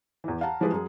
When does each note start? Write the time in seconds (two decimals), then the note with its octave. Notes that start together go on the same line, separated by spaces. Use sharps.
0.24 E2 E3
0.41 F5 F#5 A5 A#5
0.60 E3 F3 G3 G#3 G#4 B4
0.72 F#2 G#4